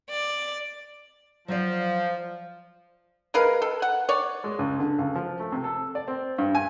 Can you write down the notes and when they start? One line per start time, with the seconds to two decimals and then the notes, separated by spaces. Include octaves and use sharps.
0.10 D5
1.48 F3 F#3 D5
3.34 G#3 A#4 B4 F5
3.62 A4
3.82 F#5
4.09 C#5 D5
4.44 G#3
4.59 C#2
4.79 D3
4.99 C#2
5.15 F3
5.40 A3
5.52 C3
5.64 A4
5.95 D5
6.08 C4
6.38 G2
6.55 G#5